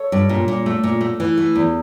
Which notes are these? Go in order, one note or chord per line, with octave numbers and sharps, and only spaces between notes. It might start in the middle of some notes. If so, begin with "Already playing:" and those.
Already playing: A4 C#5
G2
A#2
A#2
A3
A#2
A3
E3
A3
E2